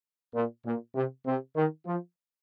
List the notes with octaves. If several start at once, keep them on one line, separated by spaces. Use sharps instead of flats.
A#2
A#2
C3
C3
D#3
F3